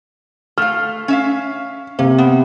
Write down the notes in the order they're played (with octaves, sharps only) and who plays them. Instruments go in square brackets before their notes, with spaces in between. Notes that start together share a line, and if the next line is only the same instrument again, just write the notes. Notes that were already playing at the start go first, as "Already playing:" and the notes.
[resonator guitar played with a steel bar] A3 F5 [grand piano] F6
[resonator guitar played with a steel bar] C#4 E5 F5
[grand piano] C3 [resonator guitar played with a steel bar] A#3
[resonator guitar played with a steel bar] B3